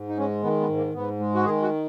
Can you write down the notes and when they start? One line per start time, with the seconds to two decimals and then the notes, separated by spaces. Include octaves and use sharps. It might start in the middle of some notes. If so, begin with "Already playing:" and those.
Already playing: G#2
0.09 D#4
0.17 G#3 C#4
0.43 D#3 B3
0.61 B3
0.68 G#2
0.77 A#3
0.94 G#2 B3
1.20 G#3
1.34 F#4
1.45 D#3 G#4
1.62 F#4